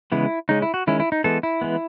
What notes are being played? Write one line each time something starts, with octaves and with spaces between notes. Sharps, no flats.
C#3 E3 G#3 B3 E4
C#3 G#3 C#4 D#4
E4
F#4
D#3 G#3 C#4 E4
E4
D#4
E3 G#3 B3 A4
E4
E3 G#3 B3